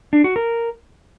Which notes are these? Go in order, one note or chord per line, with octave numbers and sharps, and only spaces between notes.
D4
F#4
A#4